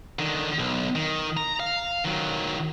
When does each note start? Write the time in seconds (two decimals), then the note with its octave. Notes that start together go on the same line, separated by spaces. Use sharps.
0.19 D3 D#3
0.59 B1
0.95 D#3
1.37 A#5
1.60 F5
2.05 D#3 F#3